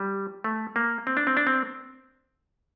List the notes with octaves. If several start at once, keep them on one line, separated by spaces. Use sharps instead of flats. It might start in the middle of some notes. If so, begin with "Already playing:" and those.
Already playing: G3
A3
A#3
C4
D4
C4
D4
C4